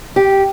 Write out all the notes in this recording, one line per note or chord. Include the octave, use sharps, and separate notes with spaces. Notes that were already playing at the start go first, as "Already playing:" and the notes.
G4